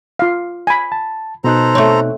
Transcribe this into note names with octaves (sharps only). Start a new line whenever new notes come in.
F4 F5
G#5 B5
A5
B2 D#4 A4 C5 A#5 F#6
A3 C4 C#5 C#6